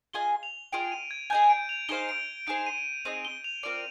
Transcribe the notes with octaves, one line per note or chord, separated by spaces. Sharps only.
F4 G#4 D#5 G#5 G7
F7
F4 G#4 D#5 G5 D7
D#7
G#6
G#4 D#5 G#5 G6
D7
F7
D#4 G#4 C5 F5 G7
D7
D#4 G#4 C5 D7
D#7
C4 D#4 G#4 D#5 D#7
G7
F7
C4 F4 A#4 D5 D7